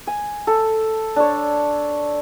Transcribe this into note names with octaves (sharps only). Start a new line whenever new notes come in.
G#5
A4
D4 C#5